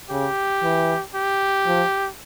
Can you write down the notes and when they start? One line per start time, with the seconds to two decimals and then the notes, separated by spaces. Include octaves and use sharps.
0.10 C#3 G4
0.63 E3
1.15 G4
1.67 F3